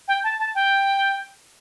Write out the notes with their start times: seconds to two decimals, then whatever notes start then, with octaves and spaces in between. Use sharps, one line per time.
0.08 G5
0.24 A5
0.39 A5
0.55 G5